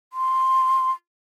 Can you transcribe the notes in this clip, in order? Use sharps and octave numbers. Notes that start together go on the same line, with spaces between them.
C6